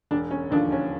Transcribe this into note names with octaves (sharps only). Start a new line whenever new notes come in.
E1 D4
C#4
D#2 D3 F3 D4
C#4